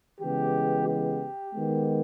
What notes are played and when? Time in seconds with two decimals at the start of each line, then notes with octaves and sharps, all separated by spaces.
0.21 C#3 E3 G#3 B3 G4
0.87 G4
1.54 D#3 G#3 B3